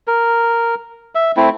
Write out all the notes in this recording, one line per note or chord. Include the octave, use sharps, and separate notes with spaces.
A#4
E5
A3 C4 E4